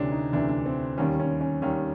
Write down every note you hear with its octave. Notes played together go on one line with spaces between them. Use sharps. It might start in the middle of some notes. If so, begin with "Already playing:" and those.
Already playing: D2 C3 E3 C#4 D4
D#4
D2 C3 E3 D4
D4
C4
D#2 D#3 G3 C#4
C#4
C#4
D#2 D#3 G3 C#4